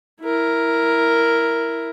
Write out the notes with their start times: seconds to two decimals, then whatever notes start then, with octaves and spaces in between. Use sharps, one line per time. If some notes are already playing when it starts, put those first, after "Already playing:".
0.21 E4 A#4